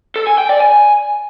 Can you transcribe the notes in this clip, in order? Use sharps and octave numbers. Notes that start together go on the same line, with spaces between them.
A4
G#5
G5
D5
G#5